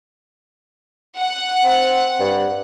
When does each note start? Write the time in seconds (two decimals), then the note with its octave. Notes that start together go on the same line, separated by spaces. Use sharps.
1.17 F#5
1.64 C4
2.20 G2